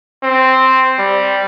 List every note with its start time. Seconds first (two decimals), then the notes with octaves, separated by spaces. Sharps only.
0.23 C4
0.99 G3